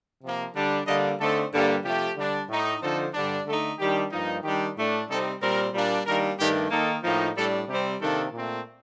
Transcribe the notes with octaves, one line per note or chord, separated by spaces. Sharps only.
C3 F3 A#3
D3 G3 D4
D3 G3 A#3 D4 D#5
D3 A3 C4 D#4 A4
G2 D3 G3 A#3
C3 F3 A3 G4
D3 G3 D4
A2 A3 D#4
D3 F3 C4 D#4 A4
G2 D3 G3 D4
D3 A3 D#4 A4
D#3 G3 D4 G4
G2 F3 A#3 D#4
D#3 G3 D4 G4
A2 A3 D4
C3 G3 C4 D#4 A4
A#2 G3 C4 A#4
A#2 G3 A#3 D4
D#3 G3 A#3 D4 A#4
G2 D#3 A3 D4 G4
D#3 A#3 D#4 A4
A2 F3 A#3 D#4
A2 G3 D4 A4
C3 G3 C4 G4
C3 D#3 A#3 D4 A4
A#2 A3 C4